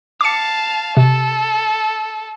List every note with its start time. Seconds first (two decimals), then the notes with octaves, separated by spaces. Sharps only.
0.21 F5 A5 D6 C#7
0.97 C3 A4